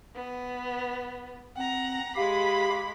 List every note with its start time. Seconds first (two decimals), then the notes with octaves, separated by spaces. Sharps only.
0.15 B3
1.57 C4 F#5 A#5
2.16 G#3 G4 F5 B5